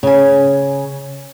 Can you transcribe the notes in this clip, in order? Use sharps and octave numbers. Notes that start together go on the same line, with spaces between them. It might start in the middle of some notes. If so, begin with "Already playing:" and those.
C#3 G#5